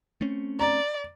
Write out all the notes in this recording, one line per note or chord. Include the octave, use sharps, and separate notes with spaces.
A3 C4 C#4
D5 A#5